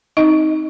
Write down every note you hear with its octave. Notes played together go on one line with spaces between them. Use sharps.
C4 D#4 D#5